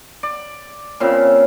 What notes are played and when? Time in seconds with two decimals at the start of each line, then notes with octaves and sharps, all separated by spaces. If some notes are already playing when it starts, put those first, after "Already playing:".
0.23 D5
1.00 A#2 C#3 C4